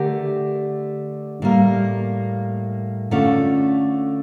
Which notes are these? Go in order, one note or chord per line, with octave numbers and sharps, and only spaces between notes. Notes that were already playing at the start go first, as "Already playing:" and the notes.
Already playing: D3 A3 D4 G4 A#4
A2 G3 A#3
D3 A3 C#4 F4 A4